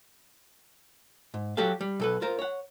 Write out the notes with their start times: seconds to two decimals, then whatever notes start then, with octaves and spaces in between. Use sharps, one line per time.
1.34 G#2
1.57 F#3 F#4 G4 A4 F5
1.81 G3
2.00 B1 A4 B4
2.22 F4 A#4 C5
2.39 C#5 F#5